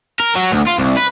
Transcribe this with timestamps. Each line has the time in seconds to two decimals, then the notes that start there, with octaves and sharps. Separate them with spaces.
0.20 A#4
0.35 F#3
0.52 D2
0.67 F4
0.78 C2
0.97 B4